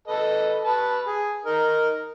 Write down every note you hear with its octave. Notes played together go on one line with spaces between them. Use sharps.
A4 B4 D#5
B4 A5
G#4
D#4 A#4